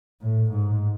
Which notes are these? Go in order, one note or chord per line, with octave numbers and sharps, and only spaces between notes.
A2
G#2